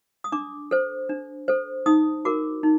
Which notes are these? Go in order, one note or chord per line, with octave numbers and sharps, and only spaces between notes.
D#6
D4 D6
A4 C5
D4
A4 C5
D#4 D#6
F#4 A#4 D6
D#4